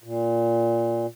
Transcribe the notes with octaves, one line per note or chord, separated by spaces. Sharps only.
A#2